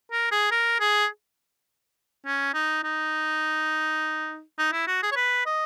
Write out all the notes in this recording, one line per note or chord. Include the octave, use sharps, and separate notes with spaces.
A#4
G#4
A#4
G#4
C#4
D#4
D#4
D#4
E4
F#4
G#4
C#5
B4
D#5